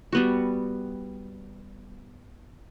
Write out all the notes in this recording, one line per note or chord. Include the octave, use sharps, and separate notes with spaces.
G3 B3 F#4